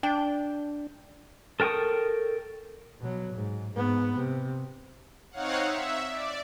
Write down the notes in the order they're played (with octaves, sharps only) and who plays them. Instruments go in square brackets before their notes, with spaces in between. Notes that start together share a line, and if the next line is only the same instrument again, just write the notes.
[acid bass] D4 [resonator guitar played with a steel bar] G5
[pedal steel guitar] A4 A#4 G5 C#6 D#6
[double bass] B2 F#3
G#2
G#2 B3
C3
[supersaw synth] C4 D#4 C#5 F5 F#5
E5
D5